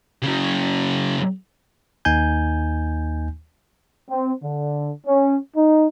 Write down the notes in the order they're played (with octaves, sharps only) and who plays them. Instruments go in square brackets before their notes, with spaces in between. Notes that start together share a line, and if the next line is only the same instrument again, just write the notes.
[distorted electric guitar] C#3 F#3
[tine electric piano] D#2 A#3 D#4 G#5 G6
[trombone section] C4
D3
C#4
D#4